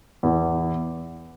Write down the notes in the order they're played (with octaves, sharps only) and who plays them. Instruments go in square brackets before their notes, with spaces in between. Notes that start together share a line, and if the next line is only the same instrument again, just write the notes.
[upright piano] E2